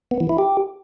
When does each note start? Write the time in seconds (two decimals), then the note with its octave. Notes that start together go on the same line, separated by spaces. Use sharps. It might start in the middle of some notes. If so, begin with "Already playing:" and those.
0.11 B3
0.20 E3
0.29 E4
0.38 G4